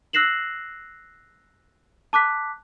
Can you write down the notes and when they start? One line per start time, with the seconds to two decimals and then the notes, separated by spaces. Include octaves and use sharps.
0.13 E6 F#6 A#6 C7 E7 F#7
2.13 A5 D6 F#6 B6